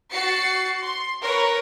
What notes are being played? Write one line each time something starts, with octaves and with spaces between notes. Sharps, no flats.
F#4 A6 C7 C#7
C6
A#4 B4 C#5